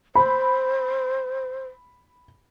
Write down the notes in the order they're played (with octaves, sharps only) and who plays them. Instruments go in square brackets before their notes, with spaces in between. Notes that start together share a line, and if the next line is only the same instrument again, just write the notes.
[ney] C5 [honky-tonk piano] B5